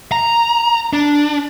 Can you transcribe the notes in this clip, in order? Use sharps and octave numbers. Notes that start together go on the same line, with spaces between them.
A#5
D4